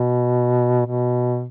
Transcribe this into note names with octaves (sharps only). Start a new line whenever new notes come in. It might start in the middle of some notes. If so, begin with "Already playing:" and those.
Already playing: B2
B2